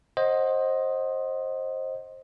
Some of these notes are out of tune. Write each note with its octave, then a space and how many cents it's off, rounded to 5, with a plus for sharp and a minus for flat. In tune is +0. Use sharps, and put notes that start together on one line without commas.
C5 +20 D#5 +0 F#5 +0